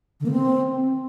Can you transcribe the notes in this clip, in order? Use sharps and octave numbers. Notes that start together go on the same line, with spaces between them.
D3
A#3
C4